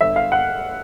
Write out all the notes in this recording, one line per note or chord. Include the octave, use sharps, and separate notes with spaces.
G1 E5
F5
F#5